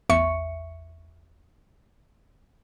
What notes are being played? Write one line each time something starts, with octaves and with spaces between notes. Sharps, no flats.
A1 E2 E5 C#6 C#7